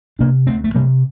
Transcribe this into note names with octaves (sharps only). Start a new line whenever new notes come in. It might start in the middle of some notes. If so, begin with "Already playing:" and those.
C3 A#3 D4
D2 A3 C4
A3
C3 G3 A#3